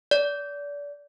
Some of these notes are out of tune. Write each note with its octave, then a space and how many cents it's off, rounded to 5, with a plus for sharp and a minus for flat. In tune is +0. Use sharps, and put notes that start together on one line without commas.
D5 -30